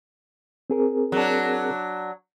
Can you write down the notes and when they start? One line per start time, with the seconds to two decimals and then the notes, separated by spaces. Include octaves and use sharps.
0.70 C4 G#4 A#4
1.12 F#3 D4